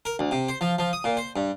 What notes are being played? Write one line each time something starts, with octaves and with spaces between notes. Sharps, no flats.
A#4
D2
C3
C5
F3
F3
D#6
A#2
C5
G2